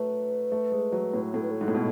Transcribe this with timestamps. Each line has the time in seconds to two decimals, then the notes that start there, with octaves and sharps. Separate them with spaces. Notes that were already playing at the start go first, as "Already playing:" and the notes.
Already playing: F#3 A3 B4
0.52 A3
0.72 G#3
0.92 F#3
1.14 A2
1.34 A2 A4
1.42 B4
1.51 A4
1.61 G#2
1.68 A2
1.75 B2